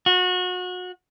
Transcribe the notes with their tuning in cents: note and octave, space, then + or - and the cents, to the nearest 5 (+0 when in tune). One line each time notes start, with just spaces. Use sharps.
F#4 -30